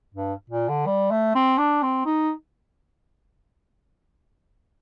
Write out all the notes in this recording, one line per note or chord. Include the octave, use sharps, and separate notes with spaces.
G2
A#2
D3
G3
A3
C4
D4
C4
D#4